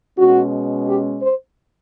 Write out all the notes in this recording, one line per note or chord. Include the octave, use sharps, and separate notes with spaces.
B2 G#3 C#4 F#4
G4
C5